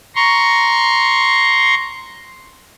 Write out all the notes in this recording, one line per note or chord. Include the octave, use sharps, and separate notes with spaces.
A#5 C6 C#6